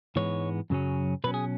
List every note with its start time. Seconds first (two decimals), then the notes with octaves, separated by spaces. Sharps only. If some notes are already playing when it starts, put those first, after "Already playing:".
0.16 G#2 E3 G#3 B3 C#5
0.70 F#2 C#3 F#3 C#4
1.24 B2 F#3 C#4 B4
1.34 G#4